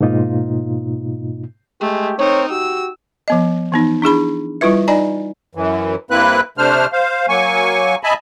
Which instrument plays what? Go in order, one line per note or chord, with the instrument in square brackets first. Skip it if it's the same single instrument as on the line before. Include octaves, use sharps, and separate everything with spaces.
[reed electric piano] G#2 B2 A#3 D#4 F4
[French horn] G#3 [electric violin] A3 [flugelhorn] G4
[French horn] C4 [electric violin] D#4 A#4 [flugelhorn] C#5
[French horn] F#4 [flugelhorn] G4 [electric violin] E6
[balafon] F3 B3 D#5
E3 B3 D#4
D4 E4 G#4 B5
G3 E4 F4 B4 E5
D#4 D5 D#5 G#5 A#5
[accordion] F#2 E3
G2 A#3 C4 E4 B4 F#6
C3 A3 D4 C5 F6
C5 F5
F#3 A#3 G#5 C#6
D#5 E5 G#5 A5 B5